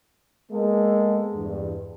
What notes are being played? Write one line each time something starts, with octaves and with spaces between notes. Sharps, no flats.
G#3 A#3 B3 A4
E2 G2